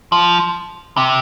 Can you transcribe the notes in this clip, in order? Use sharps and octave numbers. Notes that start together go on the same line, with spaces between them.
F3
C3